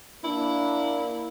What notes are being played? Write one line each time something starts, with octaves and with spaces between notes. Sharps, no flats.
A#3 D4 E4